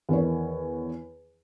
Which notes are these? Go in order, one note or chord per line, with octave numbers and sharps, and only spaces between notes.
E2 D#3 C#5